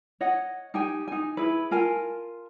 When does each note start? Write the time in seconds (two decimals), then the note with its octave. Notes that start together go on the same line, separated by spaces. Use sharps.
0.21 C#5 D#5 F#5
0.74 D#4 G4 G5 G#5
1.08 D#4 G#5
1.37 E4 G#4 B4
1.71 F4 A#4 G#5 A5